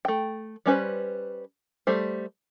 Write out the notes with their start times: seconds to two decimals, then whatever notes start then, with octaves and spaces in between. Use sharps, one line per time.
0.05 A3 G5
0.66 G3 C#4 B4 C5
1.87 G3 A3 C5